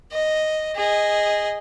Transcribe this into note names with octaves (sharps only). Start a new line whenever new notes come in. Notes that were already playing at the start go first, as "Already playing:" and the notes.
D#5
G#4 D#5